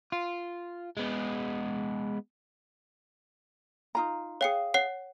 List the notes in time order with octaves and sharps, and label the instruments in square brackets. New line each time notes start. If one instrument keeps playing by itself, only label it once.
[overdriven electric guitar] F4
G#3 B3
[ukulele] D#4 F4 A#5
[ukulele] G#4 F5 [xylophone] C#5 G5 C#7
[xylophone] C#5 F#5 C7